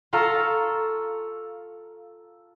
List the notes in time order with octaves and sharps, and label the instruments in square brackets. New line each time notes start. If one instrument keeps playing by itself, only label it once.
[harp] F4 A4 F5 A#5 C#6 E6